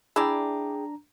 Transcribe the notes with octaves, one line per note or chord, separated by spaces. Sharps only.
D4 E4 G#4 D5 G5 A#5